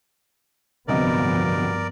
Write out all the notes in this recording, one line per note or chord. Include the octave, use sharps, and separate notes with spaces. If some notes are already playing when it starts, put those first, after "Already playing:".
D1 C2 G2 F3 B3 A#4 D5 D#5